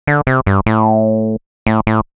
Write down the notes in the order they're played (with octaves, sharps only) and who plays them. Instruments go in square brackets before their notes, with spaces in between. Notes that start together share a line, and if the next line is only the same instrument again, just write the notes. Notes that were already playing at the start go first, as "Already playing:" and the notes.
[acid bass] D3
C3
G2
A2
A2
A2